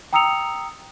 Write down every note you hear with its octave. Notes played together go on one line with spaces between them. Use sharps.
G5 A#5 D#6 E6 C#7 F7